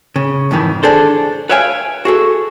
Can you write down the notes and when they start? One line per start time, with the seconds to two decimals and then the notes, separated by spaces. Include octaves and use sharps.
0.16 C#3
0.51 F2 G#2 D#3 E3
0.83 D4 G#4 A4 C5
1.49 B4 C#5 E5 F5 G5 G#5
2.05 F#4 G#4 A4